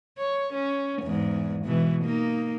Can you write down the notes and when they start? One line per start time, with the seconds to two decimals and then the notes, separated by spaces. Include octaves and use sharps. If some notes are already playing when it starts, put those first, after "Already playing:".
0.18 C#5
0.53 C#4
1.02 E2 G#2
1.65 B2 E3 G#3
2.02 A#3 D#4